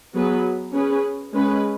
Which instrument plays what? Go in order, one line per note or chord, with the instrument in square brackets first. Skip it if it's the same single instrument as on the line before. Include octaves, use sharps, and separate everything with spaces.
[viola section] F#3 B3 G#4 B4
C#4 G#4 B4
G#3 C#4 B4